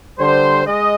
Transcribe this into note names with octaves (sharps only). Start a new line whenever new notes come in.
D3 G3 C5
G#3 D#5